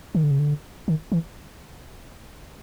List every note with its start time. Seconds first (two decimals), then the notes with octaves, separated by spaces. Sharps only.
0.15 D#3
0.24 D3
0.31 C#3
0.39 D3
0.88 D#3
1.12 E3